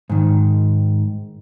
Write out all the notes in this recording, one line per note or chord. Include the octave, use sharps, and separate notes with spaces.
G#2 D#3